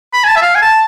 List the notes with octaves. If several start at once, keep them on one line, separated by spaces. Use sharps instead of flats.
B5
G#5
A5
E5
F5
G#5
A5